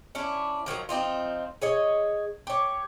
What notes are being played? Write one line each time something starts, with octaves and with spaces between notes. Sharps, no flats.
C#4 D4 E4
D#3 F3 F#3 A#4
F3 C4 D#4 F4
G#4 C#5 D#5
G4 C#5